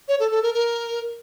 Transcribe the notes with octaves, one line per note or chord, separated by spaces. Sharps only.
C#5
A4
A4
A#4
A#4